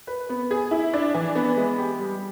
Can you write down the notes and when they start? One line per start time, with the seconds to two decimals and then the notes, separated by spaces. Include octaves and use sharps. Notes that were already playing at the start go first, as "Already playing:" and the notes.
0.07 B4
0.29 B3
0.51 G#4
0.71 E4
0.93 D4
1.14 E3
1.35 B3
1.56 G#3
1.78 G4
1.99 G3